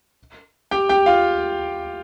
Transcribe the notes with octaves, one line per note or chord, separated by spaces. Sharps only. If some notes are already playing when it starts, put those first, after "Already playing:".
G4 G5
G4 G5
F4 F5